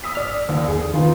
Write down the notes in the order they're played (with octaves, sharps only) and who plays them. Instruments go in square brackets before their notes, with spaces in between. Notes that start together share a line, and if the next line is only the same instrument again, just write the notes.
[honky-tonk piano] D#6 E6 B6
[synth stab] G#1 D5 F6
[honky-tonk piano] D#2
[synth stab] E2 [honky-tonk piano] G#4
[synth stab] D#3 [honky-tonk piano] B3 D#4 F4